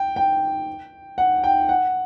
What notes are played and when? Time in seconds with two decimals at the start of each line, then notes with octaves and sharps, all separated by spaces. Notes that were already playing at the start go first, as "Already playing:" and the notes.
Already playing: G5
0.16 G5
1.18 F#5
1.44 G5
1.69 F#5